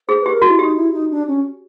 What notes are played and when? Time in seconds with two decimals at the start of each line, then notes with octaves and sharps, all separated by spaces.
0.08 G#4 C5
0.21 B4
0.26 G4
0.33 A#4
0.42 F#4
0.47 E4
0.59 D#4 G4
0.76 E4
0.93 D#4
1.11 D4
1.28 C#4